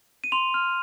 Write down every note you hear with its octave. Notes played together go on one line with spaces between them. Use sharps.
D#7
C6 F7
F6